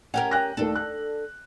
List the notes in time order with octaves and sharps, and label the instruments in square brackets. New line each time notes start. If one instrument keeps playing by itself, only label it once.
[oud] C#4 G4 A#4 [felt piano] F#5
[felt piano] G5 F#6 A#6
[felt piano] D#2 A3 [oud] D4 A4
[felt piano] F#6